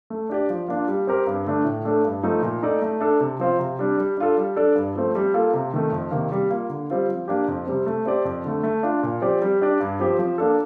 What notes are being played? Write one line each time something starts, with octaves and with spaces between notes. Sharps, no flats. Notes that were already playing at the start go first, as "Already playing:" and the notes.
A3
D4 G4 D5
F3
A#3 D4 F4
G3
C4 G4 A#4
G2
D3 A3 D4
A2
A3 D4 A4
G2
F3 A3 D#4
A#2
A3 D#4 A4 D5
A3
D4 A4
C3
F3 C4 F4
C3
G3 D4
G3
D4 F4 A4
G3
D4 A4 D5
G2
F3 A3 C4
G3
A#3 F4 A4
C3
D#3 A3
F2
C3 D#3 A#3
G3
A#3 F4
D3
G3 C4 F4
F3
A#3 D4 G4
F2
C3 G3 C4
A3
C4 G4 D5
F2
D3 A3
A3
D4 F4
A#2
F3 C4 G4 D5
G3
D4 G4 D5
G2
F3 C4 G4
F3
A#3 D4 A4